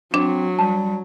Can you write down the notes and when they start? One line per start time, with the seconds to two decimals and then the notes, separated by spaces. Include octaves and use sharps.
0.14 F#3 C4 D4
0.59 G3 A5